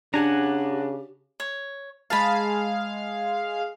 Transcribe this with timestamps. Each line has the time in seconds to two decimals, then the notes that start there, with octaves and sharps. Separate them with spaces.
0.14 C#3 D4 G4 F#5 G#5 A#5
1.40 C#5
2.10 G#3 G#4 F5 A5 B5